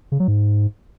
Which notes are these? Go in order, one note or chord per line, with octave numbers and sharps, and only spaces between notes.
C#3
F#3
G#2